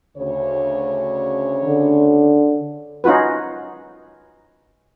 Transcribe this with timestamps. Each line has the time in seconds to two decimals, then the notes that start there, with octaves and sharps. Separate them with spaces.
0.17 D2 C#3 C#5
1.66 D3
3.04 C#4 D#4 F4 F#4 B4